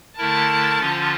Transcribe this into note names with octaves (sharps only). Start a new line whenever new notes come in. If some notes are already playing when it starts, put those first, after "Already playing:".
D3 A3 E4 A#4 A5
D3 F3 C#4 F4